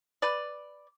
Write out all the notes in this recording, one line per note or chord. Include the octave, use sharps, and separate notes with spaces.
B4 D5